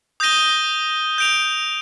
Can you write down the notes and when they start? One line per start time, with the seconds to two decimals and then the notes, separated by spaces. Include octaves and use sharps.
0.20 D#6 G6 A#6 D#7 G7
1.18 G6 D7 F7